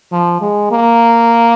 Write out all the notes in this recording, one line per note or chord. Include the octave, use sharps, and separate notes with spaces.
F3
G#3
A#3